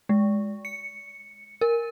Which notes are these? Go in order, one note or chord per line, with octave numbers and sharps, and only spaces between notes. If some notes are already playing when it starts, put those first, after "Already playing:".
G#3
C#7
A#4